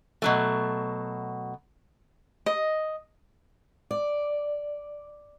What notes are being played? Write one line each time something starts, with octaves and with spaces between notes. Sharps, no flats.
B2 F#3 A3
D#5
D5